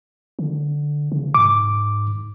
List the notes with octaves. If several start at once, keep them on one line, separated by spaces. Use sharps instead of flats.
D3
C#3
G#2 D6